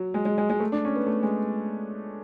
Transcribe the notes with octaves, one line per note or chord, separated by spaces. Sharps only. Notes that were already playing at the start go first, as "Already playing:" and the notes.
Already playing: F#3
G#3
G#3
G#3
G#3
A3
D4
C#4
B3
A3
G#3